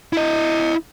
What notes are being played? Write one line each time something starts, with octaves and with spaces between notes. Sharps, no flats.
E4 D#5